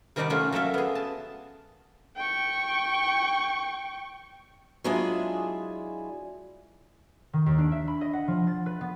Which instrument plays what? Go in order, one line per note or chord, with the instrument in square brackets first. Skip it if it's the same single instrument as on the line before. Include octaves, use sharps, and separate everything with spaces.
[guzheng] C3 D#3 G3 D#4 D5 F#5
A3 C#4 F4 E5 F#5
F#3 A#3 A4 E5
B3 G#4
A5
[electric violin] G5 C#6
[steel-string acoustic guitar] F#3 G#3 D4 E4 F4 G#4
[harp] D#3
D#2
D4
E5
B5
D#5
F#5
F3
A6
B4
B3